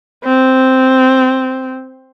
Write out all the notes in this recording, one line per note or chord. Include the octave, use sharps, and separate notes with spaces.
C4